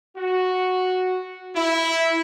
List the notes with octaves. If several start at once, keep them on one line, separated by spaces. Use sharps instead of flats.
F#4
E4